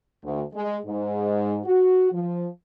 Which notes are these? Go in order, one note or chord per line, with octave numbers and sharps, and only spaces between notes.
D2
G#3
G#2
F#4
F3